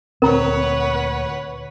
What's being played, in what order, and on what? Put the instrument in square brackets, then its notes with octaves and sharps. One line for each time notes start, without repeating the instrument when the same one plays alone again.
[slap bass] D2 A#2 [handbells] C4 [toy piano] A#4 A#5 [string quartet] B4 C#5 F#5